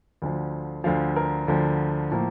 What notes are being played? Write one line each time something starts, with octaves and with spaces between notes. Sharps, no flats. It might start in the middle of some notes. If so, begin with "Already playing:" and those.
D2 D3 F3
D2 D3 F3 F5
A#4
D2 D3 F3
A2 F3 A#3